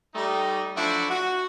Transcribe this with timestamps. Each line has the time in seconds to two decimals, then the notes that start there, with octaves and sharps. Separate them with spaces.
0.15 G3 A3 D#4
0.77 F3 F#3 A3 D4 E4 F#4
1.10 F#4